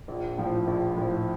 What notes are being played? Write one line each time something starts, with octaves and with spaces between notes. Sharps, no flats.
A#1
A2 F3
A#1
A2 F3